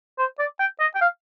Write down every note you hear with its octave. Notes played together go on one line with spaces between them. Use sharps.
C5
D5
G5
D#5
G5
F5